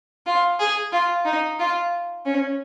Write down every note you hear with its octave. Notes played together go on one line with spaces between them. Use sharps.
F4
G#4
F4
D#4
F4
C#4